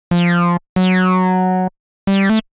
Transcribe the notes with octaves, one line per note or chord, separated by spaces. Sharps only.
F3
F#3
G3
A3